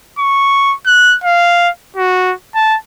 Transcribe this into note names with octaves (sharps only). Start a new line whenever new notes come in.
C#6
F#6
F5
F#4
A5